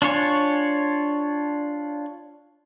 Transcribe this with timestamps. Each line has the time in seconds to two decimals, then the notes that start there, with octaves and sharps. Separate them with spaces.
0.02 D4 F4 C#5 G#5